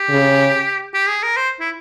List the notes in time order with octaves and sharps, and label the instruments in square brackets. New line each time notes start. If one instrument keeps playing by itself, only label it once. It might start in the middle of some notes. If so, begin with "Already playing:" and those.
Already playing: [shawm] G4
[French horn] C#3
[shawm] G4
G#4
A#4
C5
E4